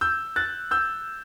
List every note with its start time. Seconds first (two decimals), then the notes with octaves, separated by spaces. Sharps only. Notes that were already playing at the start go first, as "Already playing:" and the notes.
0.01 E6 G6
0.36 F#6 A6
0.71 E6 G6